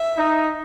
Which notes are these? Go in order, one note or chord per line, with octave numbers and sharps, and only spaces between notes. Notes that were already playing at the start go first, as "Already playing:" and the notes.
Already playing: E5
D#4